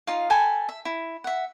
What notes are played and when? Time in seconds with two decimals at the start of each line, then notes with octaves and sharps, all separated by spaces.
0.07 D#4 F4 F5
0.30 A4 G5 G#5 B5
0.69 E5
0.85 E4
1.24 E5 F#5